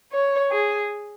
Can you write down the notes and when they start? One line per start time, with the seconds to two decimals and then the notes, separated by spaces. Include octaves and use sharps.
0.11 C#5
0.51 G#4